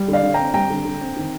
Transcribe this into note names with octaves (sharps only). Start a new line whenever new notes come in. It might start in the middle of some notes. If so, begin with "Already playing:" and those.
Already playing: G3
D3 D5 F5
D3
C4 G5 A#5
G3 G5 A#5
D3
D3
C4
D#3